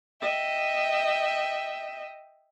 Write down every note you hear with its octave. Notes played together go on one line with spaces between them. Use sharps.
D#5 E5 G5